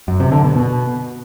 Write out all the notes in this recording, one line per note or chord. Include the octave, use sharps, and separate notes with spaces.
F#2
C3
D3
B2
B2